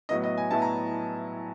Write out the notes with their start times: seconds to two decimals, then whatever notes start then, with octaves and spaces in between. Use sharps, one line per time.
0.09 A2 F#3 B3 E4 D#5
0.23 D#5
0.38 G#5
0.51 A2 F#3 B3 E4 A5
0.62 A#5